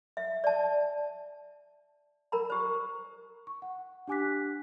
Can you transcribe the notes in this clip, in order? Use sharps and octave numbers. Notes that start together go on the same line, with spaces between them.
E5
D5 A5
A#4 A#5 B5
G4 C5
C#6
F#5
D4 G4 G#5 D6 F#6 B6